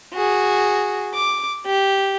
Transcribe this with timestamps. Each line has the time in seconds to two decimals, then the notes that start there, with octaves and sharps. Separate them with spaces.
0.14 F#4 G#4
1.14 D6
1.66 G4